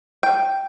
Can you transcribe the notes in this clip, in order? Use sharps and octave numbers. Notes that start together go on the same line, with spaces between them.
G5